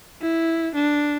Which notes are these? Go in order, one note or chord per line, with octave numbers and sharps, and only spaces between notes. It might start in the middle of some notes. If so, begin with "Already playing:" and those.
E4
D4